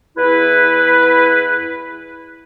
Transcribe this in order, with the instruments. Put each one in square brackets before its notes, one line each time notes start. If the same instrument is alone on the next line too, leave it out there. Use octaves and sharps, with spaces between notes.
[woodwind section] E2 E4 B4